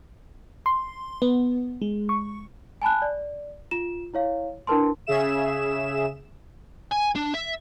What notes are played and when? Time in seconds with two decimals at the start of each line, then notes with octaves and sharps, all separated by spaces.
0.66 C6
1.22 B3
1.82 G#3
2.09 C#6
2.82 G#5 A5 B5 F#6
3.02 D5
3.71 F4 E7
4.14 E4 C#5 F5
4.67 D4 E4 A#4 B4 A5 C6
5.07 C#3 G#4 E5 E7
6.91 G#5
7.15 D4
7.34 E5